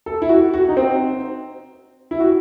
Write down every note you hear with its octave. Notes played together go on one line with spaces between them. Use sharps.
A4
E4
F#4
F#4
D#4
C4
E4
F#4